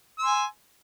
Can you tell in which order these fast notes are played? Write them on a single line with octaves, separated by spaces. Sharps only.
E6 C6 G#5